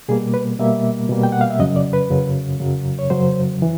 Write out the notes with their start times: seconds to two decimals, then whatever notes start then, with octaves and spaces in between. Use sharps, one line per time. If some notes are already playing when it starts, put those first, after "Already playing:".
0.08 B2 G3 A#3 G#4
0.34 B4
0.59 B2 G3 A#3 E5
1.09 B2 G3 A#3
1.23 G5
1.32 F#5
1.41 F5
1.50 E5
1.59 F#2 C#3 F#3 D#5
1.76 D5
1.93 B4
2.10 F#2 C#3 F#3
2.60 F#2 C#3 F#3
2.99 C#5
3.10 F#2 C#3 F#3 C5
3.62 E3